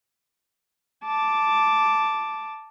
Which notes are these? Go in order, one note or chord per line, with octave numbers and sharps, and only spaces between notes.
A5 D6